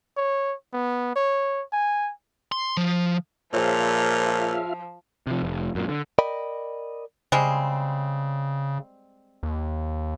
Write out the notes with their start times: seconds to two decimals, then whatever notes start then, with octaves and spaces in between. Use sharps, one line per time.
0.17 C#5
0.73 B3
1.16 C#5
1.72 G#5
2.52 C6
2.77 F3
3.53 A#2 F3 F4 G#4 C5 C#5 E5 F6
5.27 C3 F3
5.43 F1
5.75 F#2 A#2
5.89 D3
6.19 A#4 D5 D#5 G5 B5
7.32 C#3 G3 G#3 C4
9.43 D#2